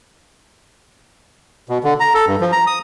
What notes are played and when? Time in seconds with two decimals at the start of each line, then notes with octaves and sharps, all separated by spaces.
1.69 B2
1.84 D3
2.00 A#5
2.14 A4
2.28 G2
2.41 F3
2.52 A#5
2.67 D#6